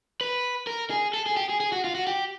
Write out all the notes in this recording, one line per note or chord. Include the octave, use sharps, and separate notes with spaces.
B4
A#4
G#4
A4
G#4
G4
G#4
G#4
F#4
F4
F#4
G4